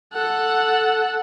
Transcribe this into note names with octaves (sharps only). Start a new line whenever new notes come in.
A4 F#5